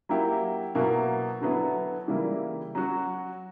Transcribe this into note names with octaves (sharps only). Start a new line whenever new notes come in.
F#3 A#3 E4 G4
B2 F#3 A#3 E4
D3 F#3 B3 E4
C#3 E3 G3 A#3 E4
F#3 C#4 F#4